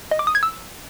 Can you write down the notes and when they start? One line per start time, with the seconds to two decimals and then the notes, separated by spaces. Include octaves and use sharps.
0.11 D#5
0.19 D6
0.27 D#6
0.35 G#6
0.43 E6